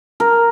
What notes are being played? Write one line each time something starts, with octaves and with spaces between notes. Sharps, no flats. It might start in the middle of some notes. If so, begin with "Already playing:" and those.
A#4